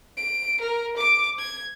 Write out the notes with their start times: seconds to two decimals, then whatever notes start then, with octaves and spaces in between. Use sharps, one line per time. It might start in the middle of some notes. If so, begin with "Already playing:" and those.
0.17 D7
0.61 A#4
0.97 D6 D7
1.38 G#6